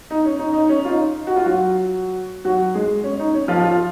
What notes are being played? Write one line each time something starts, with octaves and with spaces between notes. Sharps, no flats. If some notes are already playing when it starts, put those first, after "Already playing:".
D#4
C#4
D#4
D#4
C#4
F4
D#4
F#4
F4
F#3 F#4
F#3 F#4
G#3 G#4
C#4
D#4
C#4
F3 F4
F3 F4